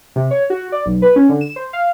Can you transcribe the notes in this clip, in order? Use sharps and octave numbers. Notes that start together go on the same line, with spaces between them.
C3
C#5
F#4
D5
B1
B4
C#4
D3
E7
C5
F5